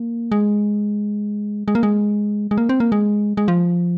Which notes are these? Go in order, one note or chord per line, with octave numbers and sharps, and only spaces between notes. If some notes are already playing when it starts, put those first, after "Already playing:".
Already playing: A#3
G#3
G#3
A#3
G#3
G#3
A#3
C4
A#3
G#3
G#3
F3